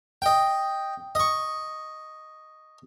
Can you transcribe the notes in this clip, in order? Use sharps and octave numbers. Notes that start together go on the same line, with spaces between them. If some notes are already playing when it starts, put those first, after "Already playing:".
D#5 G5
D#5 C#6